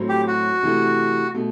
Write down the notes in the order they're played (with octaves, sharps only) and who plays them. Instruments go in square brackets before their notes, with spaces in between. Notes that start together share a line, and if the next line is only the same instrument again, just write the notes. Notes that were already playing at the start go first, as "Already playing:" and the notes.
Already playing: [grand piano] A2 F#3 C4
[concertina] G4
F#4
[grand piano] C3 E3 A3
B2 A3